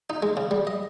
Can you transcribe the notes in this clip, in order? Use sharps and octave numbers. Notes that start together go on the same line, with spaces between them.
D#4
G#3
C#3
G3
D#5